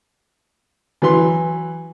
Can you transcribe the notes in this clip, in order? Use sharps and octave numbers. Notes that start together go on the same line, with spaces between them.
E3 F#3 B4 C6